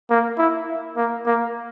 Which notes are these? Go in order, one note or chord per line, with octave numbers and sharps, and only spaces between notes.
A#3
E4
A#3
A#3